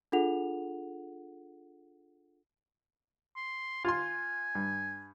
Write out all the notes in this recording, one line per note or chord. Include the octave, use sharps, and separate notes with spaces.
D4 F4 G#4 A4 F#5 F7
C6
F4 G#5 C6
G2